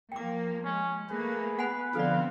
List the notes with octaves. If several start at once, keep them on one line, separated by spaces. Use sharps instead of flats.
F3 A#3 G5 D6
G#3 C#4
A3 A#3 G#4 B4
B3 F#5 G#5 B5
D3 F3 B3 C4 A4 D5 F5